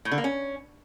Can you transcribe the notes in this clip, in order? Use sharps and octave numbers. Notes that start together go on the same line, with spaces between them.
A2
D3
A#3
C#4